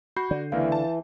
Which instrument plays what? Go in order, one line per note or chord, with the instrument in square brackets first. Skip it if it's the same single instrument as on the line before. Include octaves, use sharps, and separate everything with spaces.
[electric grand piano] F#4 G6 C7 [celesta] B5
[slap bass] D3 [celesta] D5
[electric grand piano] C#2 A#3 A#4 [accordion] E3 [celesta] F5
[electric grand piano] A5